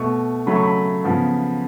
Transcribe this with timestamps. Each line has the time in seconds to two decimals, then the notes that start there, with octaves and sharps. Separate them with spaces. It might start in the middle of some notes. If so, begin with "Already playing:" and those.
Already playing: B2 A3 C#6
0.47 C#3 F#3 A3 B5
0.56 C#6
0.63 B5
1.04 C#3 F3 B3